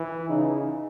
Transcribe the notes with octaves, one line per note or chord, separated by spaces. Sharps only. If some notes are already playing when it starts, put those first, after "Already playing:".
Already playing: E3
C#3 D#4